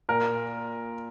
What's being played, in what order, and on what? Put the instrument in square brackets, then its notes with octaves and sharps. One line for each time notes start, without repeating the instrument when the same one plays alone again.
[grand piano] A#2 A#4